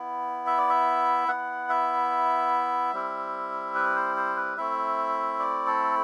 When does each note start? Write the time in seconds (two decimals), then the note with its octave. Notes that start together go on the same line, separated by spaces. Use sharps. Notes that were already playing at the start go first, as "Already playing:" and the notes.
Already playing: B3 E4
0.47 E5
0.58 D5
0.70 E5
1.28 B3 E4 F#5
1.70 E5
2.93 G3 C4 E4
3.75 B4
3.96 C5
4.16 C5
4.36 B4
4.57 A3 C4 E4 E5
5.39 D5
5.66 A4